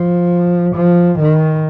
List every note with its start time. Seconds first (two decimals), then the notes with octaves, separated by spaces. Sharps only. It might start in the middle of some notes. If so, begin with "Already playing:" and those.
Already playing: F3
0.75 F3
1.19 D#3